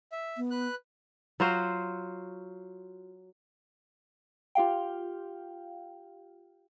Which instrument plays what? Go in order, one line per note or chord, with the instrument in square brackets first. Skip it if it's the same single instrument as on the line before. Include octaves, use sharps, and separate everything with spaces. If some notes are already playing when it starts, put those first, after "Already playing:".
[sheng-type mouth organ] E5
[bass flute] B3
[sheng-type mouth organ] B4 F#6
[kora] F#3 F4 F#4 C5
[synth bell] F4 G4 F5 G5